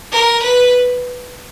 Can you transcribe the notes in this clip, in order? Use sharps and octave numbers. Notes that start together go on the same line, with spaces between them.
A#4
B4